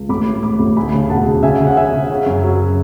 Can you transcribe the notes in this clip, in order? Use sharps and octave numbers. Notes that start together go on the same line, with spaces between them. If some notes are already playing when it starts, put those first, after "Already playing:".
Already playing: C#2
A1 B5 D6
A2
A2 B5 D6
A1
D2 G#5 B5
C#3
E1 F#5 A5
C#3
C#3 E5 G#5
C#3
F#5
C#3 E5 G#5
C#3
C#3
F#2
F#3